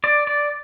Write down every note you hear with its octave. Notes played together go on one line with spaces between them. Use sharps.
D5
D5